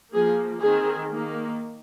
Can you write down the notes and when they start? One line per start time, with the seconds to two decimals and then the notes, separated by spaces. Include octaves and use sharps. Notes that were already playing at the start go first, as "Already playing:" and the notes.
0.13 F3 A#3 G#4
0.62 D#3 C4 G#4
1.11 D#3 A#3